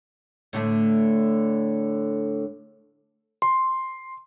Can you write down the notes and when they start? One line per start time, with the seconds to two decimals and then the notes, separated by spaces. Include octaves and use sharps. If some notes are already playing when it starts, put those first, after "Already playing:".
0.53 A2 D3 A3
3.42 C6